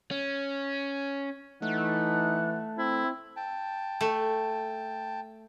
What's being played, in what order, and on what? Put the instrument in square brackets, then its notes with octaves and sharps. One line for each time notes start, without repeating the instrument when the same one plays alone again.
[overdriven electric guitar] C#4
[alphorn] E3 [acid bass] A3 [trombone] D#4 [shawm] F#5
[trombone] C4 [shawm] E4
[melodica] G5 A5
[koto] A3